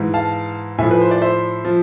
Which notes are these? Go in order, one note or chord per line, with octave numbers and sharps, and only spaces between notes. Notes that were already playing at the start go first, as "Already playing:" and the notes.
Already playing: G#2 E3
F5 A5
A2 F3 E5 G#5
B4
C5
D5
C5 E5
F3